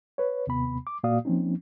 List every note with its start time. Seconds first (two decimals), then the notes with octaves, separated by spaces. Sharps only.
0.18 B4 C#5
0.47 D#2 C3 B3 B5
0.87 D6
1.04 A#2 A#3 F#4 D5 F5 D#6
1.25 F3 A#3 C4 C#4 D#4